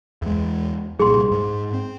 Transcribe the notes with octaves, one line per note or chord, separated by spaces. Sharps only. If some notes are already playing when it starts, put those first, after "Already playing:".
E2 G#3
C2 A#2 G3 G#4 C6
G#2
C4